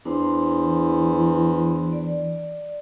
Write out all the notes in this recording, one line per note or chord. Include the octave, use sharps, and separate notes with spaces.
E2 D4 C5 C6
E3
D5